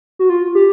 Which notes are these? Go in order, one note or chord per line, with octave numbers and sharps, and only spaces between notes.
F#4
F4
G4